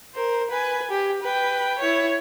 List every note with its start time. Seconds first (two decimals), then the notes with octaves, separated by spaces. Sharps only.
0.14 A#4 C5
0.50 B4 G#5
0.91 G4
1.22 B4 G5
1.79 E4 C#5